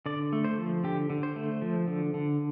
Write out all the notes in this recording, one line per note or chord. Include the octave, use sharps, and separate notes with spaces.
D3 D5
A3
C5
F3
D3 G4
D3
C5
A3
F3
D3
D3